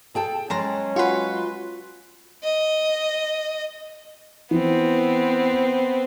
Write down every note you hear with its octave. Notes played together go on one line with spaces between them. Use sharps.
G#4 A4 G5 A5
F#3 G#3 C#4 A5 A#5 C6
F4 F#4 B4 C#5 C6
D#5
E3 B3 C4